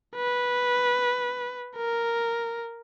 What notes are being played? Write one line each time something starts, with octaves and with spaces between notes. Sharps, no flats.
B4
A#4